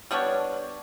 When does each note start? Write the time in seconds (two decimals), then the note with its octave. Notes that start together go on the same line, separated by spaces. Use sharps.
0.11 G3 B3 D4 C#5